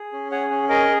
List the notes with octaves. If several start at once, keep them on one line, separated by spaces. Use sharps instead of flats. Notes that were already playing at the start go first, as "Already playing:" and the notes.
Already playing: G#4
C#4
G#4 C#5 F#5
C#4
G#4 A#4 D#5